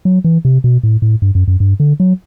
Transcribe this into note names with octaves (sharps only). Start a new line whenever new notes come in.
F#3
E3
C3
B2
A2
A2
G2
F#2
F#2
G2
D3
F#3